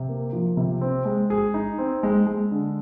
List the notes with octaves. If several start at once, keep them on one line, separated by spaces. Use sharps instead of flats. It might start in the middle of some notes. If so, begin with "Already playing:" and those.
Already playing: C3
A#3
F3
C3
C4
G#3
G#4
D#4
C4
G#3
G#3
D3